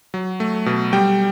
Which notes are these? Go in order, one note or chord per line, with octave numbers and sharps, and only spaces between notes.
F#3
A3
B2
G3 G5